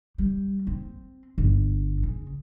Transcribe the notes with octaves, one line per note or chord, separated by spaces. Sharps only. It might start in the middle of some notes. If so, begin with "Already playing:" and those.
G3
C4
G1
C#3